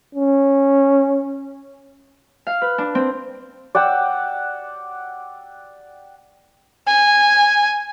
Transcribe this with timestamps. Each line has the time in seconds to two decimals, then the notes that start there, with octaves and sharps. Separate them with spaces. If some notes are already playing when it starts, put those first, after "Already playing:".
0.15 C#4
2.47 F5
2.62 B4
2.78 D4
2.95 C4
3.75 D5 F#5 G5 E6
6.87 G#5